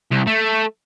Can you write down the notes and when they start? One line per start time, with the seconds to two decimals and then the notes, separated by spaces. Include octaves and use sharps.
0.11 C2
0.27 A3